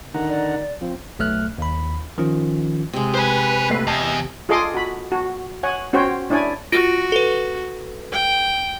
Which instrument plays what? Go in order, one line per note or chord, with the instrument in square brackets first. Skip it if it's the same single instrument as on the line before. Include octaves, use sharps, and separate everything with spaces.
[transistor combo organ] D3 F#5 A#5 [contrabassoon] D#3
[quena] D5
[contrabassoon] F3 [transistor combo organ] C4
[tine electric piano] B1 A3 F6 F#6
D#2 B5
D#3 F3 C#4 F4
[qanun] C3 G#3
[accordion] B4 [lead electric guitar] C5 G#5
[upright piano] A#1 A3 C7
[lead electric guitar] E2 [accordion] D#5 [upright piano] A5
[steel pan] F4 G#4 A4 D#5 C6 D6
F#4 B5
F#4
C#5 F#5 G#5
C#4 F#4 C5 C#5 G5
D4 E4 C#5 D5 G#5
[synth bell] F4 A#6 D7 [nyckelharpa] F#4
[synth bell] A4 B4
[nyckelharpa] G5